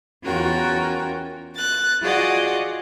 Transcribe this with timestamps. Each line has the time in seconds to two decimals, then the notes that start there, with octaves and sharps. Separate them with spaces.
0.23 E2 C#4 F4 F#4 A#4 G5
1.54 F#6 A6
2.01 F4 F#4 G#4 D5 D#5 F#5